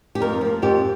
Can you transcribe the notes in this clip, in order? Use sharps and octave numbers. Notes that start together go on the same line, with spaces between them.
G4
F2 A#4
F3 A#3
F2 G4